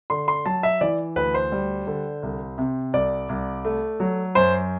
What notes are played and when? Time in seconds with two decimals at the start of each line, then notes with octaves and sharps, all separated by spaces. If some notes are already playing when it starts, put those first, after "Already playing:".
0.10 D3 C6
0.28 C6
0.45 F#3 A5
0.63 E5
0.81 E3 D5
1.16 D2 B4
1.34 C5
1.52 G3
1.87 D3
2.23 C2
2.58 C3
2.93 C2 D5
3.29 C2
3.65 A3
4.00 F#3
4.35 F#2 C5